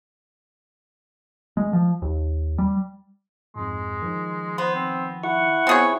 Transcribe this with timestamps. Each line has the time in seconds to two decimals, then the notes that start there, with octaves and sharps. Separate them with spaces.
1.57 G#3
1.73 F3
2.02 D#2
2.58 G3
3.55 F2 G#2 G#3
4.02 D#3 F3
4.58 B3 C5
4.75 C4
5.24 E4 F#5 C#6
5.67 B3 C4 G#4 C#5 E5 G#5